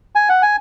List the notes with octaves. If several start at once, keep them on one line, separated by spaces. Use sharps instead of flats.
G#5
F#5
G#5